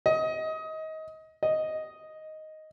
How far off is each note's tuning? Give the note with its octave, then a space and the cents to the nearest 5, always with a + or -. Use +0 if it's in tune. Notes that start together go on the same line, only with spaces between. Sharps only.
D#5 +25
D#5 +5